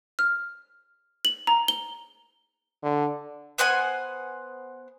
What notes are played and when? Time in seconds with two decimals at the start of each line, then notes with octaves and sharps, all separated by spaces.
0.19 F6
1.25 F#7
1.47 A#5
1.68 G7
2.83 D3
3.58 B3 C5 F#5 G#5